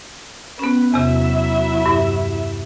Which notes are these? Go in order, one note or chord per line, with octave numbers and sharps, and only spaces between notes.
B3 C#4 B4
E2 C3 F#3 E4 E5
G2